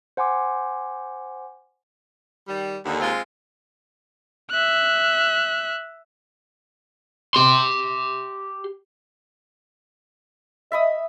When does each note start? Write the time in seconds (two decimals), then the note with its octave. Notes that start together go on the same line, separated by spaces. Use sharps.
0.17 C5 F#5 G#5 C6 D6
2.48 D#3 G3
2.85 D#2 D3
3.00 G#3 C4 F4
4.50 E5 F#6
7.34 G4 C6
10.72 D#5 E5 B5 D#6